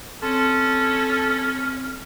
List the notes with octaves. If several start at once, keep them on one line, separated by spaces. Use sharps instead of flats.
C4 C#4 A4